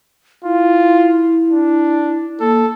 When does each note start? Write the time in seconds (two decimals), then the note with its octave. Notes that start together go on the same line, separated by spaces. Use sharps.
0.44 E4 F4
1.50 D4
2.40 A#3 A4